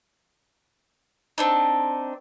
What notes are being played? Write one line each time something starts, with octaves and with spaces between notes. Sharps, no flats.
C4 D4 D#4